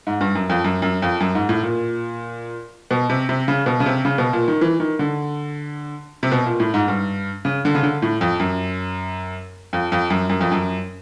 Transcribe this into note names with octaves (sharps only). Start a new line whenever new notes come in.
G#2
G2
F#2
F2
F#2
F#2
F2
F#2
G#2
A2
A#2
B2
C3
C3
C#3
B2
C#3
C3
C#3
B2
A#2
D#3
E3
D#3
D3
C3
B2
A#2
A2
G#2
G2
C#3
D3
C#3
D3
A2
F2
F#2
F2
F2
F#2
F#2
F2
F#2